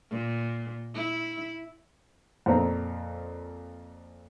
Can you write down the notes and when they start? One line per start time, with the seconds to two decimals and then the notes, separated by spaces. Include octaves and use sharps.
0.11 A#2
0.95 E4
2.46 F2 A#2 C4 A#5